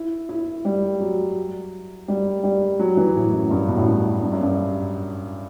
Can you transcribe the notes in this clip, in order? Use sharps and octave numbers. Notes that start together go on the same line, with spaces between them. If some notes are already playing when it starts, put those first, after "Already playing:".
Already playing: E4
E4
G3
F#3
G3
G3
F#3
E3
A2
F#2
G2
B2
A2
G2
G2
F#2
G2